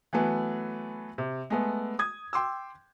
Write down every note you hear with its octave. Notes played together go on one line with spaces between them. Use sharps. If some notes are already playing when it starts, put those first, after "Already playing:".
E3 F#3 A3 B3
C3
G#3 A3 B3
D#6 G#6
G5 C6 D6 E6